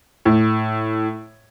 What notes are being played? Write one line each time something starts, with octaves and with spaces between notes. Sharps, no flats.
A2